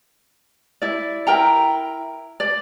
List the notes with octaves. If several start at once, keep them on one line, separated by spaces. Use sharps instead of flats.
E4 D5
E4 A#4 G5 A#5
D5